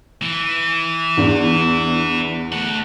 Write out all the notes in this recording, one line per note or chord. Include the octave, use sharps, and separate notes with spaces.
E3
E2 D4
A3 F#5